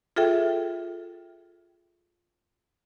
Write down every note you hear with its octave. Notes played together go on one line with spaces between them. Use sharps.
F4 G#4 A4 E5 G5